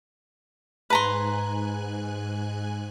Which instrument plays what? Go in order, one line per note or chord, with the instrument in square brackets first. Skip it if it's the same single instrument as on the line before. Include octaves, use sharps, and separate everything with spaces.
[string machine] G#2 G#5 F#6 [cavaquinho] B4 A#5 C6